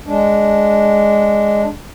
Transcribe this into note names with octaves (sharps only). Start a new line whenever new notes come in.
G#3 D4